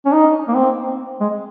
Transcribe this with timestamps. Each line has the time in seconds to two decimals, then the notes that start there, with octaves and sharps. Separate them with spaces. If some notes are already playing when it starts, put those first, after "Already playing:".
0.06 C#4
0.12 D#4
0.48 A#3
0.56 C4
1.20 G#3